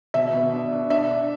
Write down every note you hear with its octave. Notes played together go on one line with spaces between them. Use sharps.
B2 E5
B2
D4
D4
D4 E5
D4